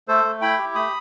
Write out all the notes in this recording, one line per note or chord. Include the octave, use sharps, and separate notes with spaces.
A3 A4 C5
A3
E4 G5 B5
G4
A3 B5 D#6